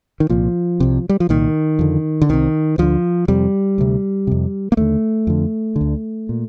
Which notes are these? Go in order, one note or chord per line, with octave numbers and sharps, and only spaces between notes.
D#3
C2 A#2 F3
C2 C3
G3
F3
C2 A#2 D#3
F2 D3
D3
C2 C3 D#3
D2 D3 F3
F2 C3 G3
D2 C3
F2 C3
A#3
D#2 D3 A3
F2 D3
D3
D2
A#2